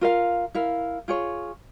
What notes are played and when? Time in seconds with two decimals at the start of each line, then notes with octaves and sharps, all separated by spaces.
0.01 F4 A#4 F5
0.55 E4 A#4 F5
1.08 F4 G#4 C#5